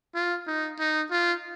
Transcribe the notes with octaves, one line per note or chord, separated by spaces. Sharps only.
F4
D#4
D#4
F4